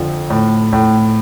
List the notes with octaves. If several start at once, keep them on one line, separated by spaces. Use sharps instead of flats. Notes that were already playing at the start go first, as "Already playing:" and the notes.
Already playing: F2 D3 F3
A2
A2